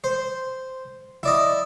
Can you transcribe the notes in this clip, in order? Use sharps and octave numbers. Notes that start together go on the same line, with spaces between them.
C5
E4 D5 D#5